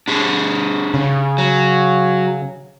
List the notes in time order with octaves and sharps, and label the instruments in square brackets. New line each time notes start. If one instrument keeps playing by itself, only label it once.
[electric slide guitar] D4 G4 G#4
[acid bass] C#3
[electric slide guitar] F#3